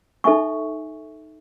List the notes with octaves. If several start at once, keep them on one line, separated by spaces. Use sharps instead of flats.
D#4 A4 E5 G#5 C#6